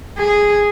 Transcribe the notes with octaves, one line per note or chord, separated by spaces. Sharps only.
G#4